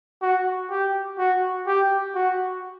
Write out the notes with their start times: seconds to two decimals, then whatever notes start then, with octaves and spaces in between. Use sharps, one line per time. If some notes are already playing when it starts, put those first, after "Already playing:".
0.22 F#4
0.70 G4
1.18 F#4
1.67 G4
2.15 F#4